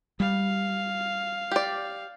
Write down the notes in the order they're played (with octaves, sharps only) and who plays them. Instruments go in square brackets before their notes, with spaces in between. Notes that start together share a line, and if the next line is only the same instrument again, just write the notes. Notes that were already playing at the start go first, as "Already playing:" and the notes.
[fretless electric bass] G3 [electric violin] F5
[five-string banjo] G4 D5